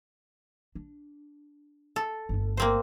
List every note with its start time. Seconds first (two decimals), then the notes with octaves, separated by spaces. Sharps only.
0.75 D4
1.96 A4
2.29 G1 A3
2.57 A#3 C4 C5